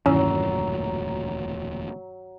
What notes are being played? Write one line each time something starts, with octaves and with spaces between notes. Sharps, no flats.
E1 D2 G2 A#2 D#3 F#3 C#4 E4